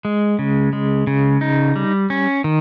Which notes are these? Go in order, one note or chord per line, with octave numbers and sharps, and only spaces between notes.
G#3
C#3
G#3
C#3
D#4
G3
C#4
D#3